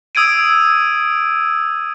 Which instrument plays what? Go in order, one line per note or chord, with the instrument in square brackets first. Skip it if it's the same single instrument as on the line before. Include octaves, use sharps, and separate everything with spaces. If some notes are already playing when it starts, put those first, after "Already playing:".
[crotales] D#6 E6 G#6 D7 D#7